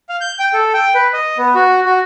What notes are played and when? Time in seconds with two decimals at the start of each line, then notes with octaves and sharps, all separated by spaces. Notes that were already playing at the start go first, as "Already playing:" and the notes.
0.09 F5
0.21 G6
0.39 G5
0.53 A4
0.74 G5
0.95 B4
1.13 D#5
1.38 B3
1.55 F#4
1.86 F#4